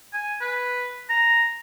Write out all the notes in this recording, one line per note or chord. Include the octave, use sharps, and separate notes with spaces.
G#5
B4
A#5